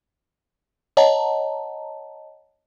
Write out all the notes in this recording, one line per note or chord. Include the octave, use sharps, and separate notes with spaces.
C#5 D#5 F#5 A5 A#5